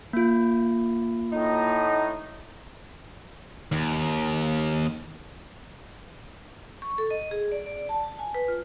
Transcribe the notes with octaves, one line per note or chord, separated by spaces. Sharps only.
A#3 F4
A2 D#4
D#2
C#6
A4
D#5
G#4
D5
D5
A5
A5
G#5
B4
F4